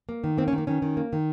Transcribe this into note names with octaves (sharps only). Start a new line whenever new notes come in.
A#3
D#3
A#3 C4
C#4
D#3
A#3
D#3 C#4
D#3
A#3
D#3